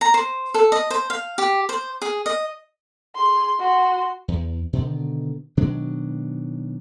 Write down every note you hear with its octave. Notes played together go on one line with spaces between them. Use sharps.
A#5
C5
A4
D#5
C5
F5
G4
C5
G#4
D#5
G#4 C6
F#4 C6
E2
B2 D3 D#3
B2 D#3 F#3 D4